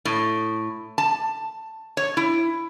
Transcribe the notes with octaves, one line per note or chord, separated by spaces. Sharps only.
A2
A5
C#5
E4